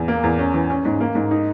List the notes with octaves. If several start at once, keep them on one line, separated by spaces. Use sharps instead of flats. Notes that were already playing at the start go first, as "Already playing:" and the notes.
Already playing: E2
A#3
E2
C#4
E3
C#4
G#2
A#3
G#2
D#4